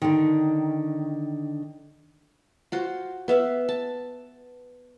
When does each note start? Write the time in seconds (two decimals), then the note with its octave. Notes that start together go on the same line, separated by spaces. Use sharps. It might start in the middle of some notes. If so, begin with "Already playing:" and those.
0.02 D3 D#3
2.72 F4 F#4 C5
3.28 B3 E5 F5
3.69 A5